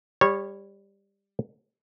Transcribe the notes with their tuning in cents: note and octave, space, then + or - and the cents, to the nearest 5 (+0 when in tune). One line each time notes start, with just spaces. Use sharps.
G3 +15 C#5 -15